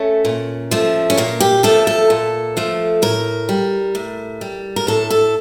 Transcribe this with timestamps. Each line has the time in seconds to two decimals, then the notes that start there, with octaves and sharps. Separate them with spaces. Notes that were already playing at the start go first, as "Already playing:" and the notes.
Already playing: A3 C#4
0.25 A#2
0.71 F3 A3
1.10 C#4
1.17 A#2 A#3
1.40 G4
1.63 F3 A3 A4
1.87 A4
2.10 A#2
2.57 F3 A3
3.02 A2 A#4
3.49 G3
3.95 A2
4.41 G3
4.76 A#4
4.87 A2 A4
5.10 A4